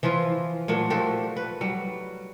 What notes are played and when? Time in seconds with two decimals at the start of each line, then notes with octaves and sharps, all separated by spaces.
0.03 E3 F3 E4 F4
0.68 A#2 F#3 A3 D4
0.90 F3 F#4 G4 A4
1.36 B4
1.61 F#3 G3